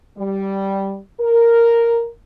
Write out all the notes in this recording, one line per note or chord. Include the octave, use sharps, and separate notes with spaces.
G3
A#4